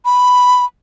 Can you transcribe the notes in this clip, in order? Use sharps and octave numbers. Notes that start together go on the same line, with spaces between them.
B5